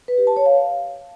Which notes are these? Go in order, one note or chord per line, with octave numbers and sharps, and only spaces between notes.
B4
G4
A5
C#5
F5